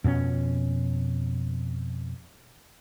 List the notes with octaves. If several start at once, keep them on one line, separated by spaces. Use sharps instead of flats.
F2 B2 B3 C#4